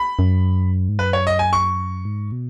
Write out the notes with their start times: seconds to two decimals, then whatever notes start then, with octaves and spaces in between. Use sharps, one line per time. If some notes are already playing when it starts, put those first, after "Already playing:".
Already playing: B5
0.19 F#2
0.89 G#2
0.99 F#2 B4
1.13 C#5
1.27 D#5
1.39 G#5
1.53 C#6
2.05 G#2
2.32 B2